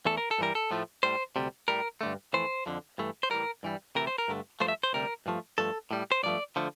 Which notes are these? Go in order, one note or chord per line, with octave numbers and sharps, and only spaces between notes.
E2 E3 A3 A4
A#4
A4
G2 E3 G3 A#4
A4
A2 F3 A3
A2 G3 C5
D2 C3 G3
A2 G3 A#4
G2 D3 A3
F2 E3 A3 C5
F2 D3 F3
G2 E3 A3
C5
A2 E3 G3 A#4
G2 E3 G3
D2 C3 E3 A3 A#4
C5
A#4
G2 D3 A3
G2 F3 A3 C5
E5
C5
D2 C3 G3 A#4
G2 F3 A3
G2 F3 A3 A4
A2 G3
C5
G2 F3 A3 D5
D3 F3 A3